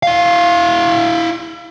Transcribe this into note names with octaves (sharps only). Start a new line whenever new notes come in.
E4 F5